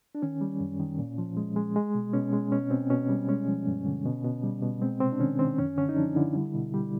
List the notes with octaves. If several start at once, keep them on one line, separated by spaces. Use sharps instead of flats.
D4
D#3 C#4
G3
F#2
D#3
A#2
F3
G#3
G#3
G#3
B2
B2 C#4
G#3
B2 C#4
B2 C4
B2 C#4
G3
G#3 C#4
F3
G2
D3
B2
B2
G3
B2
G#3 C4
C3 C4
D4
D#3 C#4
D#3 C4
F#2 C#4
D3 C#4
D#4
F3 D4
D3 E4
G3
B2
G3